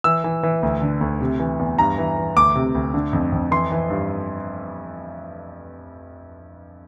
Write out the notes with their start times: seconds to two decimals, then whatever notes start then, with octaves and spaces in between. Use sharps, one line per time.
0.04 E3 E6
0.24 E3
0.43 E3
0.63 D2
0.81 D3
1.01 D2
1.21 C3
1.40 E3
1.59 E2
1.78 G2 A#5
1.98 E3
2.17 E3
2.36 D2 D6
2.55 C3
2.75 D2
2.94 D3
3.13 F2
3.32 F2
3.51 E3 C6
3.72 E3
3.90 G2